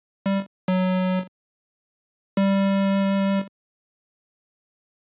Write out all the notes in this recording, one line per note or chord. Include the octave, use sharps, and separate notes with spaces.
G3
F#3
G3